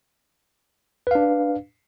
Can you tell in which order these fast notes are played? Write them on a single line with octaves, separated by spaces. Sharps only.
B4 F5 D4